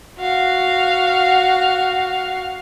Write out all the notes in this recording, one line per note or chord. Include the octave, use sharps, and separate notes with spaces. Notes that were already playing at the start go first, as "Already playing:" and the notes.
F#4 F5